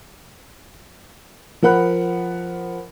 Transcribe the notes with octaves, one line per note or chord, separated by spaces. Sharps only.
F3 A#4 F#5 B5 F#6